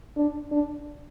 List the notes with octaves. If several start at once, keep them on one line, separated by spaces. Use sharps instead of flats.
D4
D4